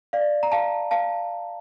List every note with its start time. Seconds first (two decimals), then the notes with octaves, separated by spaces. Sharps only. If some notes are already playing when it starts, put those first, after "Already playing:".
0.13 D5 F5
0.43 A#5
0.52 F5 A5
0.91 F5 A5